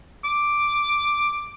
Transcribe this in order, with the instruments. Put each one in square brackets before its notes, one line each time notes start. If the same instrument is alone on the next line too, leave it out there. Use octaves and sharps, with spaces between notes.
[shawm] D6